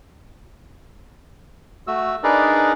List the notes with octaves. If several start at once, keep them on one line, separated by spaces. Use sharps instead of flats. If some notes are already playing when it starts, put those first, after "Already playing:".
A3 F#4 E6
D4 D#4 G#4 A#4 B4 D5